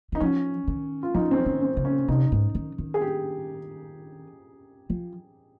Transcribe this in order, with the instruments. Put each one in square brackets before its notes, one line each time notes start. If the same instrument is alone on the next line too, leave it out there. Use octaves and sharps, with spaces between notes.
[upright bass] D#3 [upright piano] D#4
[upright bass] F3 [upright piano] C#4
[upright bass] D#3
[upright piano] F4
[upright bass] F3 [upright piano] D#4
[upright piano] C4
C#4
[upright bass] D#3
[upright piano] C4
[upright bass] C#3
[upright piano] C#4
[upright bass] C3 [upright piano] D#4
[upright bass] G#2
D#3
D#3
[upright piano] G#4
G4
[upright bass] F3